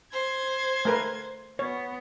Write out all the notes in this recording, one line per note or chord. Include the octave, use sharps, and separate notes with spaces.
C5 G#6
A3 A#4 B4
B3 C#5